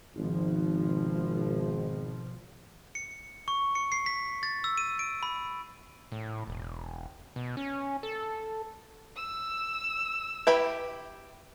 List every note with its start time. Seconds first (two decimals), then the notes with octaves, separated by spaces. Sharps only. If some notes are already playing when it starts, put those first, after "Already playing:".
0.16 G#1 B2 F3
2.95 C#7
3.48 C#6
3.75 C#7
3.92 C7
4.06 B6
4.43 A6
4.64 E6
4.78 D#7
4.99 D7
5.23 B5
6.12 A2
6.47 E1
7.36 B2
7.57 C#4
8.03 A4
9.16 E6
10.47 E4 G4 B4 B5